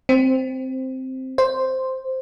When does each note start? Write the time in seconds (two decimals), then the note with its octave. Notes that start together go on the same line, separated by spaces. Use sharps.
0.09 C4
1.38 C5